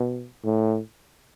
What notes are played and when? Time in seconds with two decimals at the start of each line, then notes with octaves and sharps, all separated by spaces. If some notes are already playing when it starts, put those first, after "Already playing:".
Already playing: B2
0.44 A2